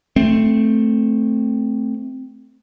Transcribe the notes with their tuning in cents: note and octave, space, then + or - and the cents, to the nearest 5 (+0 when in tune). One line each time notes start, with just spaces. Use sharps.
A3 +0 C4 +0